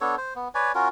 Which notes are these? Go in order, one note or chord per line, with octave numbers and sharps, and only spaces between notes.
B3 D4 A4 C#5
C5
B3
B4 C#5 D5 G#5
C#4 F4 F#4 A#4